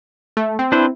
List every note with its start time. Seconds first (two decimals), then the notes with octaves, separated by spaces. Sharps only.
0.37 A3
0.59 C4
0.72 D4 E4 B4 C5